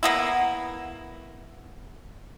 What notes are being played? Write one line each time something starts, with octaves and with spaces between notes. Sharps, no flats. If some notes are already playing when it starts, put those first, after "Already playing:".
A#3 B3 E4